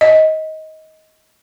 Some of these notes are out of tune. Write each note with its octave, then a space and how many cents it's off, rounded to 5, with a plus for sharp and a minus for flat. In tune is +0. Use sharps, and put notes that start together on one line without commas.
D#5 +20